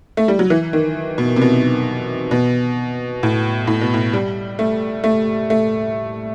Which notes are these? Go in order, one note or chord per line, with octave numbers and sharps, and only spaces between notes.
A3
G3
F#3
E3
D#3
B2
C3
B2
B2
A2
A2
B2
A2
G3
A3
A3
A3